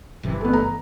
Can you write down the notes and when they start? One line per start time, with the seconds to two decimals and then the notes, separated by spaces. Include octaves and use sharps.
0.23 G1 C3 E3
0.41 A3 B3
0.53 A#5